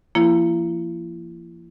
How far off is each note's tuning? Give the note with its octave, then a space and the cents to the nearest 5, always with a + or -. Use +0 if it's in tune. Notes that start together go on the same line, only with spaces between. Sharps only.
F3 -35 A#3 +0 E4 +30